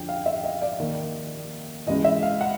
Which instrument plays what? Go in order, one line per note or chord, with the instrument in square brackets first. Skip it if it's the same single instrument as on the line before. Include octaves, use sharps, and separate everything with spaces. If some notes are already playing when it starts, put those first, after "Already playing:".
Already playing: [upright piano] F2 D3 F3 G5
F5
E5
D#5
D5
D#2 D#3
C#2 C#3 E3 D#5
E5
F5
F#5